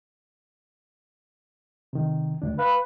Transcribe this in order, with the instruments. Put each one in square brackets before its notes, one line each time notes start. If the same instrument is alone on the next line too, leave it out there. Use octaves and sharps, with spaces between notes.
[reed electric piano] C3 D#3
D2 D4
[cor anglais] B4 [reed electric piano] F5